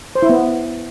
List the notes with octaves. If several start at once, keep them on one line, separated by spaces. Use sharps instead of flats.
C5
E4
B3